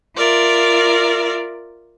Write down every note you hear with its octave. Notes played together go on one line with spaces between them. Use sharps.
F4 A#4 D5 E5